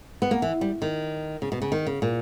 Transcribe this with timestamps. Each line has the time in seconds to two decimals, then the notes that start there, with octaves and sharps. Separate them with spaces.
0.22 B3
0.31 A#3
0.42 E3
0.61 G3
0.82 D#3
1.42 C#3
1.52 B2
1.62 C#3
1.72 D#3
1.86 C#3
2.02 A#2